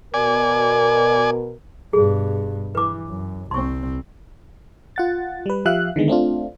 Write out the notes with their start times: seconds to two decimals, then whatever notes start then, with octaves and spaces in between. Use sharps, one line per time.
0.14 B2 A#4 D5 G#5
1.93 G2 B2 G#4
2.75 E3 B4 D6
3.08 F#2
3.51 C2 C4 C6 C#6
4.96 F4 F#5 A6
5.46 G3 B4
5.65 F3 G4 E5 F5 F#6
5.96 D3 D#3 G#3 B3
6.08 A3 C4 D4 F4